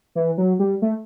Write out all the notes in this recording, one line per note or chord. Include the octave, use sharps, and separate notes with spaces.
E3
F#3
G3
A3